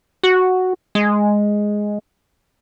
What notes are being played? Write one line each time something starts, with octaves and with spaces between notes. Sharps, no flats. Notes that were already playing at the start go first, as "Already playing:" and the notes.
F#4
G#3